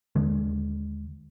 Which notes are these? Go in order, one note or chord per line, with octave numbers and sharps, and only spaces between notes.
D#2 D3 G#3